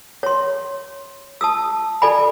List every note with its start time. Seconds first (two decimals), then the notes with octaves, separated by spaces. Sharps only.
0.23 C#5 C6
1.41 A5 D#6 E6
2.02 A4 D5 G#5 B5